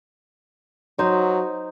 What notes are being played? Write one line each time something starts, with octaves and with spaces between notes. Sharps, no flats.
F#3 D#4 C5